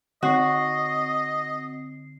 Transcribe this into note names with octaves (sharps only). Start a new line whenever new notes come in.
D3 C4 F#4 D#5 C7